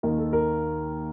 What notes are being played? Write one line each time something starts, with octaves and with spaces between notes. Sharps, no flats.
D#2 D#3 A#4
A4
A#4